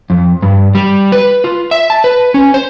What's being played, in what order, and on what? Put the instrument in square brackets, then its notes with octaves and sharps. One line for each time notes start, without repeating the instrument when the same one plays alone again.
[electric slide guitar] F2
G2
G3
B4
F4
E5
A5
B4
C#4
C5